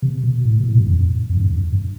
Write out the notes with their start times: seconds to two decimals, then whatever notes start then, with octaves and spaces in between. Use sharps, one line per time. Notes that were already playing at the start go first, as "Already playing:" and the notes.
0.02 C3
0.23 B2
0.45 A2
0.61 B2
0.70 A2
0.78 G2
0.87 F2
1.30 F2
1.37 G2
1.46 F2
1.72 G2